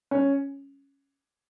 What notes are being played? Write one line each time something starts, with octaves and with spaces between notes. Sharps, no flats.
C#4